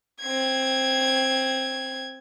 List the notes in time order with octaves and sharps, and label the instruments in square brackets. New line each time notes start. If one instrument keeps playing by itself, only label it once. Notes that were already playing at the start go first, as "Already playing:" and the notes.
[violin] C4 G#6